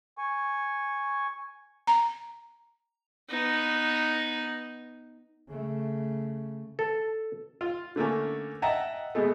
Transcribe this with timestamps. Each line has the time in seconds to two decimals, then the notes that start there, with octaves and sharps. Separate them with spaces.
0.18 G#5 C#6
1.87 A#5
3.29 B3 D#4
5.49 C#3 A3
6.79 A4
7.61 F4
7.96 D3 A3 A#3 C#4
8.62 D#5 E5 F#5 G5 A5 A#5
9.15 B2 G#3 A3